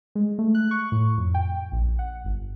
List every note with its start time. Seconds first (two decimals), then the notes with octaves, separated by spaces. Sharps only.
0.15 G#3
0.39 A3
0.55 F#6
0.71 C#6
0.92 A2
1.18 F2
1.34 G5
1.72 A#1
1.99 F#5
2.24 G1